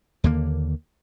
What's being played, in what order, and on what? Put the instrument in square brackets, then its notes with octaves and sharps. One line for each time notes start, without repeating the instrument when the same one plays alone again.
[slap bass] D#2 D3 A#3